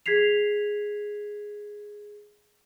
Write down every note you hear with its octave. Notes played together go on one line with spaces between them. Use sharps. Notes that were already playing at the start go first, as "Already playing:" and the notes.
G#4 G#6 B6 C7 F7